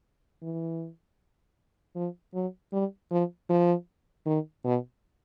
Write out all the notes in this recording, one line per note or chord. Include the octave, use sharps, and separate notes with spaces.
E3
F3
F#3
G3
F3
F3
D#3
B2